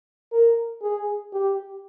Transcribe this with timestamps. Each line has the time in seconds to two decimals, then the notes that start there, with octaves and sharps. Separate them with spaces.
0.32 A#4
0.82 G#4
1.33 G4